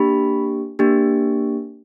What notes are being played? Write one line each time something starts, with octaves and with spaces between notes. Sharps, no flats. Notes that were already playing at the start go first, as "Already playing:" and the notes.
Already playing: A#3 D4 G4 B5
A#3 D4 G4